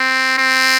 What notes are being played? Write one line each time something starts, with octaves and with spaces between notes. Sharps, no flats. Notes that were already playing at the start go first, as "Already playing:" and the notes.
Already playing: C4
C4